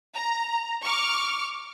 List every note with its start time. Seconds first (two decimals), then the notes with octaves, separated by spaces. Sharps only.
0.14 A#5
0.83 C#6 D6 F6